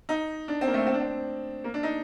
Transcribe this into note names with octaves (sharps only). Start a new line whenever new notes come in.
D#4
D4
C4
A#3
A3
C4
D4
C4
A#3
D4
D#4